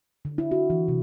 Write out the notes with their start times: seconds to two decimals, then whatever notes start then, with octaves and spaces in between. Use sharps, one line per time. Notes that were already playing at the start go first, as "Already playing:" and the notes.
0.25 D3
0.38 E4
0.51 F#4
0.70 E3
0.88 C3